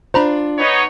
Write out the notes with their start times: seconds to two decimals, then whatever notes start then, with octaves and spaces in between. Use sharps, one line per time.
0.14 D4 F4 C5 A#5 B5
0.58 B3 D#4 C#5